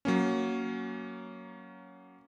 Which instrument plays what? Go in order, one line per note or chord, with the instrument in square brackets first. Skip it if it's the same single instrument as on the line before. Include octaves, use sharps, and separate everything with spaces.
[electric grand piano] F#3 A#3 C#4